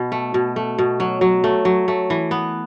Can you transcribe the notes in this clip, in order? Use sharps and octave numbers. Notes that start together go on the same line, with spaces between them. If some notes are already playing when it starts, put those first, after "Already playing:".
Already playing: B2
A3
B2
A3
B2
F#3
F#3
A3
F#3
A3
E3
B3